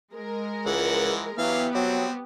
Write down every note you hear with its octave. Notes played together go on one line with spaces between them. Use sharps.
G#3 A#4
C#2 E3 F3 F#5
E3 F#3 B3 G4 F5
F#3 G3 C4